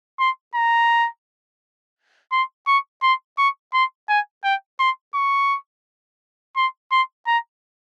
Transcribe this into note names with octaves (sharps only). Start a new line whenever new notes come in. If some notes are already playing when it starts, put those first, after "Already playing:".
C6
A#5
C6
C#6
C6
C#6
C6
G#5
G5
C6
C#6
C6
C6
A#5